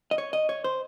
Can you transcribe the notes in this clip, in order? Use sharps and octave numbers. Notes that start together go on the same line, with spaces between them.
D#5
C#5
D#5
C#5
C5